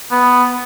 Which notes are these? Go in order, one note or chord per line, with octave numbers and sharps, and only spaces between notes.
B3